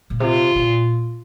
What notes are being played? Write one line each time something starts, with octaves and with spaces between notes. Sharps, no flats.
A#2
C3 F4
A#2